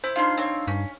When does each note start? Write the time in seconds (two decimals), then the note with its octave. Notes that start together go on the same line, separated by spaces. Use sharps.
0.04 E4 C5
0.16 D4 D#4 F4 F5 B5 C6
0.38 C4 C#5
0.67 G2 C#4